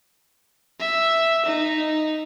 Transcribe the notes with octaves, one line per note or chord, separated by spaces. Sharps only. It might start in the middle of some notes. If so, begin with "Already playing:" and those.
E5
D#4